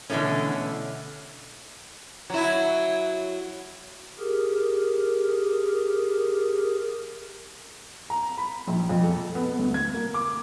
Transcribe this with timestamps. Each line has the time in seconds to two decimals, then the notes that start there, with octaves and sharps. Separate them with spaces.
0.10 B2 D3 E3 A3 B3 C#4
2.30 F#3 E4
4.18 G4 G#4 A#4
8.10 A#5
8.38 B5
8.67 A#1
8.89 F2
9.03 A4
9.35 B3
9.59 D2
9.74 G#6
9.94 A#3
10.14 D6